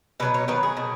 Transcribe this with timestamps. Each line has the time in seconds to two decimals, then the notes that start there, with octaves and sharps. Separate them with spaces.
0.20 B2 F#3 B3 B4
0.34 C#5
0.48 D#3 F#3 B3 B4
0.63 G#4
0.77 B2